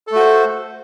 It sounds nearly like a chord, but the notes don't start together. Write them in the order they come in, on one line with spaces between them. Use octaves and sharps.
A4 A3 F#4 C5